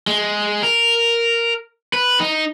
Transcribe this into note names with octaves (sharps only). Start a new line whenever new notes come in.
G#3
A#4
B4
D#4